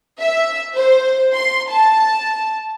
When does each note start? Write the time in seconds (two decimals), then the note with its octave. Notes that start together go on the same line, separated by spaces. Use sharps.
0.19 E5
0.76 C5
1.34 C6
1.70 A5